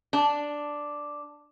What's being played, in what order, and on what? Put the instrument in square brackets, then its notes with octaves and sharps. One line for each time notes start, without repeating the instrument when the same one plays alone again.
[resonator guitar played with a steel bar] D4